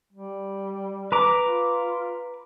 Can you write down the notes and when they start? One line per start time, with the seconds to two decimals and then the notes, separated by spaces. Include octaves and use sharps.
0.13 G3
1.12 B4 A#5 D6
1.40 F4